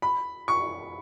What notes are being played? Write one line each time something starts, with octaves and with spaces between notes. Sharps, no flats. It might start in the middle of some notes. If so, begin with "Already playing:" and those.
B5
C#6